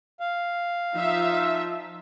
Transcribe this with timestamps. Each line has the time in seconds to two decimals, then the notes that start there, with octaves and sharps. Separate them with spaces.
0.20 F5
0.95 F3 D#4 F4 E5